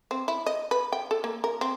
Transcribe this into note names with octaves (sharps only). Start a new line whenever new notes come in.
C4
E4
D#5
B4
G5
A4
A#3
A#4
C4